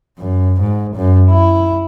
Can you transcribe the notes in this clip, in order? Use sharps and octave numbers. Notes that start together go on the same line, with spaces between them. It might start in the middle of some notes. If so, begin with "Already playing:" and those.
F#2
G#2
F#2
E4